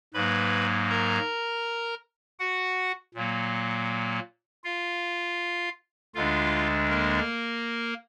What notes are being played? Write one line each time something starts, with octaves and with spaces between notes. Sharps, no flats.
G#2 F#3 A#3 B4 B5
A#4 A#5
F#4 F#5
A#2 F#3 A#3
F4 F5
D2 D3 G#3 D4 F4 F5
A#3 A#4